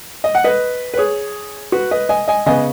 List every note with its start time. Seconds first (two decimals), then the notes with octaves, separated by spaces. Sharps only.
0.24 D#5
0.35 F#5
0.44 B4 D#5
0.94 B4
0.97 G#4 C#5
1.72 F#4 B4
1.91 B4 D#5
2.09 D#5 G#5
2.28 D#5 G#5
2.46 C#3 B3 D#5 G#5